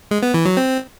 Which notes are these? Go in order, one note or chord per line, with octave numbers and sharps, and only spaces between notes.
G#3
B3
E3
F#3
C4